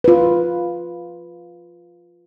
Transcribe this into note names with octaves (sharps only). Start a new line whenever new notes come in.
F4 B4